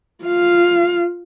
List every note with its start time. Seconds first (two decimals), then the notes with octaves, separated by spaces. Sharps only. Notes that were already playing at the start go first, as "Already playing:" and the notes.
0.24 F4 F5